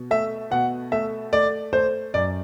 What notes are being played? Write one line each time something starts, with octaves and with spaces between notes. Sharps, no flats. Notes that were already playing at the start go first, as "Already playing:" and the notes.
Already playing: B2
A3 E5
B2 F#5
A3 E5
A3 D5
A3 C5
F#2 D5